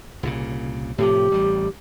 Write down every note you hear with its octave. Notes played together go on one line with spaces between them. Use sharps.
C2 A#2 C#3
A2 C3 F3 G4
A1 G3